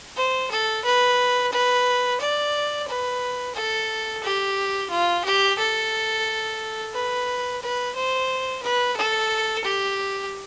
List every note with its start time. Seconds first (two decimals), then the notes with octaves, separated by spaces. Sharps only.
0.17 C5
0.51 A4
0.85 B4
1.52 B4
2.20 D5
2.88 B4
3.55 A4
4.23 G4
4.90 F4
5.24 G4
5.59 A4
6.93 B4
7.62 B4
7.96 C5
8.63 B4
8.96 A4
9.64 G4